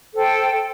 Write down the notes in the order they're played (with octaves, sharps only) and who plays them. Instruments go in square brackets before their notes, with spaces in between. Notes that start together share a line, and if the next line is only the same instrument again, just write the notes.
[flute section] A4 C5 G5